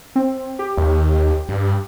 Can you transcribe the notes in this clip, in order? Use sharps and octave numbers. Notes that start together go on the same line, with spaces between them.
C4
G4
D#2
G2